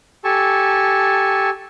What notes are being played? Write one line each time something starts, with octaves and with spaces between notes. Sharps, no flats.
G4 A4 G#5 A5 C#6